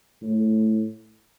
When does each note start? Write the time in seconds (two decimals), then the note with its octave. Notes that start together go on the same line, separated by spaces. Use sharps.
0.23 A2